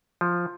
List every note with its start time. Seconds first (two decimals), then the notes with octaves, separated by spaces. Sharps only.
0.21 F3